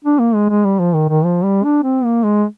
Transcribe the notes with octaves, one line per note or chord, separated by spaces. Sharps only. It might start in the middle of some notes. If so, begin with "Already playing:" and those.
D4
A#3
G#3
G#3
G3
F3
D#3
D#3
F3
G3
D4
C4
A#3
G#3